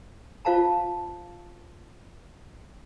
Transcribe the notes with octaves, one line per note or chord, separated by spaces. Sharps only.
F4 C5 F5 A5 A#5